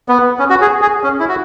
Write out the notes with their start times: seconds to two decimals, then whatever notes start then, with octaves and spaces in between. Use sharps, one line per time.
0.09 B3
0.39 C#4
0.50 F#4
0.62 G#4
0.82 G#4
1.04 C#4
1.20 E4
1.29 F#4